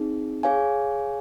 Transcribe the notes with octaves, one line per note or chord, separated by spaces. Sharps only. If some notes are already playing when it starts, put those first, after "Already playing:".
Already playing: C4 D#4 G#4
G#4 C#5 F5 G#5